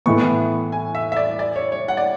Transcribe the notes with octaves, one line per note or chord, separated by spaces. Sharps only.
A2 E3 B3 C#6
G#5
E5
E5
D5
D5
C#5
C#5
F#5
D5